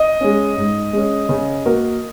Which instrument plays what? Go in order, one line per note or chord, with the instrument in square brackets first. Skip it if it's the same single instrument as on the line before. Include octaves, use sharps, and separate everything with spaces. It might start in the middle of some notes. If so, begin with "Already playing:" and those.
Already playing: [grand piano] D#5
[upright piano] G#3 C#4
G#2
G#3 C#4
C#3
A#3 F#4 A#4